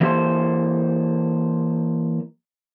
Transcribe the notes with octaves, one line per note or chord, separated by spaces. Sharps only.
E3 A3 A#3 G4 A4 C5